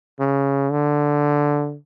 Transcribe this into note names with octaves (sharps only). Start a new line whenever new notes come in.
C#3
D3